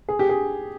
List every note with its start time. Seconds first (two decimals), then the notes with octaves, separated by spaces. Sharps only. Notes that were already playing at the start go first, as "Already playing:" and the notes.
0.08 G#4
0.19 G4
0.29 G#4